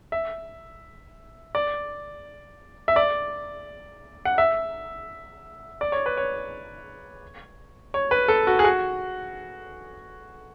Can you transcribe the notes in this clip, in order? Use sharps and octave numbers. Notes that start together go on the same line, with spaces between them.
E5
D5
E5
D5
F#5
E5
D5
C#5
B4
C#5
C#5
B4
A4
F#4
G#4
F#4